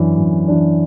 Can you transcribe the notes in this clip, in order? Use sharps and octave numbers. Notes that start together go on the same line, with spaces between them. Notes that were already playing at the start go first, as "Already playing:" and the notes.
Already playing: F#2 E3 D4
F#2
E3 D4